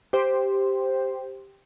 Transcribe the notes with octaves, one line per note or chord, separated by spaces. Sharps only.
G4 C5